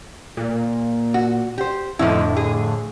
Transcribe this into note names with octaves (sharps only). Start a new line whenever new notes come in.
A#2
F#4
G4 C5
F2 A2 D3 F3 D#4 E4
G#4